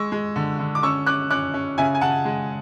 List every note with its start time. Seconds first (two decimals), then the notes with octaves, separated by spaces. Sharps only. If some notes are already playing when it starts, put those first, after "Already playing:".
Already playing: G#3 C#6 E6
0.12 G#3
0.36 D3
0.59 D3
0.75 D6
0.83 C#4 C#6 E6
1.06 C#4 D6 F#6
1.30 C#4 D6 F#6
1.54 C#4
1.78 C#3 E5 G#5
1.95 G#5
2.01 C#3 F#5 A5
2.25 G#3